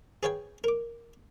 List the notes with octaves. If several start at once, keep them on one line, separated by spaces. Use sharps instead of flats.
G#4 B4 C#5 F5 G5 G#5
A#4 D6